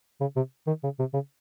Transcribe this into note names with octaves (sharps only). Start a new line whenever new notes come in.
C#3
C3
D#3
C#3
C3
C#3